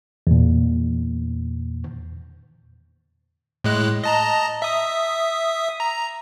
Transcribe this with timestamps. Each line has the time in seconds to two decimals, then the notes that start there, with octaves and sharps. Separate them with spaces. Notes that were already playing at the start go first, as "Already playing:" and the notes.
0.27 E2 A#2
3.64 A2 G#3 F#6
4.04 D#5 A5 A#5
4.62 E5 D#6
5.80 A#5